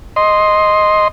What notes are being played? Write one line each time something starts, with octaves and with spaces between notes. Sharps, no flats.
D#5 C6